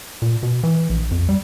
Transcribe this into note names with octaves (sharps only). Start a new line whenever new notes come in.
A#2
B2
E3
A#1
F2
G3